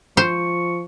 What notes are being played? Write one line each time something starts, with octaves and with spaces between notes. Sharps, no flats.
F3 C5 C#6